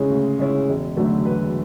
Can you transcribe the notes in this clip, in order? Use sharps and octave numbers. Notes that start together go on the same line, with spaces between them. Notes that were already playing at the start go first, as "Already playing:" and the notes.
Already playing: C#3 G#3 C#4 E4
D2
C#3 G#3 C#4 E4
E1
D2 D3 F#3 A3
E1 B4